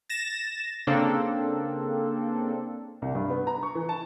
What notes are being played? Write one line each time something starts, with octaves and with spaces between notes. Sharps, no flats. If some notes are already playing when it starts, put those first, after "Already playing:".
A6 A#6 E7
C#3 A#3 C4 D4 A4
C2
G2
B3
A#5
C#6
E3
A5